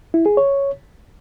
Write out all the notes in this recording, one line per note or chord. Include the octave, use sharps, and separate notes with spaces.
E4
G#4
C#5